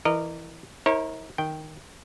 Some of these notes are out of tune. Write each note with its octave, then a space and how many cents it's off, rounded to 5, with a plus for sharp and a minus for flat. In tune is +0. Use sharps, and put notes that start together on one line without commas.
E3 +0 A#4 -15 D#5 -35
E4 -45 A#4 +0 C#5 -35
D#3 +0 G5 +0